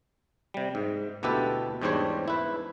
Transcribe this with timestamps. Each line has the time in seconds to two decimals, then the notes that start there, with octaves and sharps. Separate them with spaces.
0.54 C3 G3
0.75 G#2
1.23 D2 B2 E4 G4 A4 B4
1.82 E2 G#2 G3 D4 C5 C#5
2.28 E4 B4